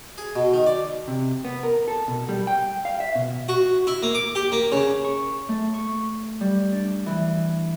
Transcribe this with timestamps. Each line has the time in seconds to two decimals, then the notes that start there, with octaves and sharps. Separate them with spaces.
0.18 G#4
0.36 B2
0.54 D#3
0.67 D5
1.08 C3
1.45 B3
1.63 A#4
1.88 A4
2.08 B2
2.29 G3
2.47 G5
2.85 F5
3.00 E5
3.15 B2
3.49 F#4
3.87 E4
4.03 A#3
4.15 D6
4.35 G4
4.52 A#3
4.72 C#3
5.04 C#6
5.49 A3
5.74 C#6
6.41 G3
6.72 D4
7.06 E3